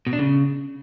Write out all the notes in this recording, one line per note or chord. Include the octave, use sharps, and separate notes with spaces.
B2
D4
C#3